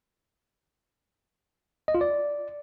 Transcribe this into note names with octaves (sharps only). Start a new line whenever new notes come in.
D#5
F4
D5